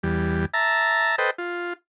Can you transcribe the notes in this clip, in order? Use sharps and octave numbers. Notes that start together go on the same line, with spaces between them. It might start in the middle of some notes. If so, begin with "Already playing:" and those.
E2 G3
E5 A5 A#5
A4 B4 C5 D#5 G5
F4